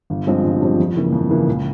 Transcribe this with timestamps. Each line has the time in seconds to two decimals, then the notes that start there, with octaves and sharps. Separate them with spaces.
0.10 G1
0.27 G2 F3 G#3 C4
0.44 G1
0.61 G2 F3 G#3 C4
0.78 F2
0.96 C#3 E3 A#3
1.12 F2
1.30 C#3 E3 A#3
1.47 C#2